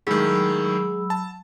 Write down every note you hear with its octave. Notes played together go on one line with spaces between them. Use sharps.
A2 D#3 F#3 G#3 B5 E6
A5